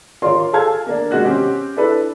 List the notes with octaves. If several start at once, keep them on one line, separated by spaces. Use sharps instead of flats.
F4 A#4 C#5 D5 C6
G#4 A4 F5 A5 F6 G#6
A#3 D4
C3 G#3 F#4 F#6
C4 C#4 G4
D4 E4 A4 B4